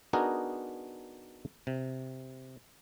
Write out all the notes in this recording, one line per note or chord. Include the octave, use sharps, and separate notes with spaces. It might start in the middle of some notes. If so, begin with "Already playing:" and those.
B3 D4 D#4 F#4 G#4 A#4
C3